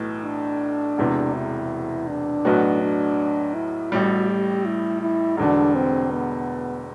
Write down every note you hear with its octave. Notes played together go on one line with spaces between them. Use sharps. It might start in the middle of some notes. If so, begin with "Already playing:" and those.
Already playing: B1 A2 E3 A3
D4
E1 E2 C3 E3
E4
D4
B1 A2 F#3 B3 F#4
D4
E4
A1 A2 G3 F#4
G4
E4
E4
E1 E2 D3 D4
C4
B3